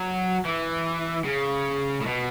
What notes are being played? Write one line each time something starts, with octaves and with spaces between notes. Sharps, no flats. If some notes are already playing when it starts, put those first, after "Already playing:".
Already playing: F#3
E3
C#3
A2
B2